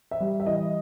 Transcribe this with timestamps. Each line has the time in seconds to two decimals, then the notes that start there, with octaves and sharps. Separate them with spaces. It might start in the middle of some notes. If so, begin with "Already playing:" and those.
0.11 E5
0.20 G3
0.40 E5
0.46 E3 D#5